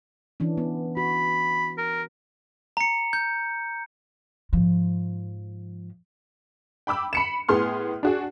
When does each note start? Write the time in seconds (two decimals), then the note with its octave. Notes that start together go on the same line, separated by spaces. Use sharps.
0.40 E3 C#4 D4
0.58 B3
0.97 F#4 B5
1.78 A#4
2.77 A#5 C#7
3.13 G6
4.53 G#2 F3
6.87 G5 B5 D6 E6
7.13 B5 C#7 E7
7.49 A2 B3 G#4 C6 F6
8.03 D4 F#4 G#4